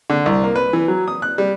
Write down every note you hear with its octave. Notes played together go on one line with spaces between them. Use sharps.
D3
C2
A#3
B4
E3
F#3
D#6
F#6
G3